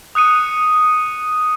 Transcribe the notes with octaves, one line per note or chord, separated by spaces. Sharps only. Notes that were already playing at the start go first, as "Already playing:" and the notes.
D#6 F#6 C#7 D#7